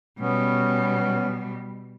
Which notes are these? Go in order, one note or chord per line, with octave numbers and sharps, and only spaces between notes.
B2 G3 B3 C#4